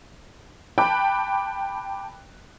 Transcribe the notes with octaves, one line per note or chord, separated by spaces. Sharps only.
G5 A5 B5 D6 F#6